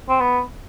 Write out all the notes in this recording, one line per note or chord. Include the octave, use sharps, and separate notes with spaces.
C4
B3